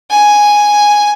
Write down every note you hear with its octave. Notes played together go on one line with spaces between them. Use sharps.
G#5